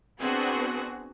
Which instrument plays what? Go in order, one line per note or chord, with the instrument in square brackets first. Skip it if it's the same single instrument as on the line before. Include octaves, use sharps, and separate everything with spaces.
[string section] B3 C4 D4 F#4 G#4